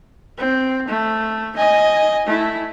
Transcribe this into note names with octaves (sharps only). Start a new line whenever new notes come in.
C4
A3
D#5 G#5
A3 E4